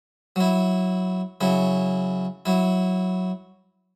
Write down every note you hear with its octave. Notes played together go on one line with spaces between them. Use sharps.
F#3 E4
C#3 F#3 E4
F#3 E4